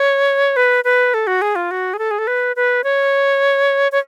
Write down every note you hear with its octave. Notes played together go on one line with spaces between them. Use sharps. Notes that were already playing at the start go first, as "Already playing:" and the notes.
Already playing: C#5
B4
B4
A4
F#4
G#4
F4
F#4
G#4
A4
G#4
A4
B4
B4
C#5
C#5